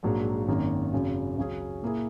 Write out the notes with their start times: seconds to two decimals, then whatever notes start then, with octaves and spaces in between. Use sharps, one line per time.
0.03 A#1 G#2 F#3 A#3
0.48 G#1 F#2 D#3 A#3
0.93 G#1 F#2 C#3 F#3
1.37 C#2 C#3 F#3 C#4 G#4
1.82 A#2 A#3 E4 G#4